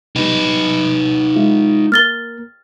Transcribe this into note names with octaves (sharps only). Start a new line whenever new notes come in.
B2 G3 D#4 B4
G#3 E4 F4
A#3 A#4 F6 A6 G7